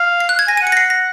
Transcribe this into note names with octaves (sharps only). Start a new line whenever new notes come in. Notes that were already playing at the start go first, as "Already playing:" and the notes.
Already playing: F5
C7
F#6
G#6
G#5 A#6
D#7
F#5 C#7
A#6
C7
A#6